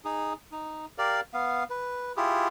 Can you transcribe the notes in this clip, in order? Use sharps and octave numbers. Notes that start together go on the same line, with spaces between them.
D#4 G#4
D#4
G4 A#4 D5 F5
B3 F5
B4
E4 F4 G4 G#4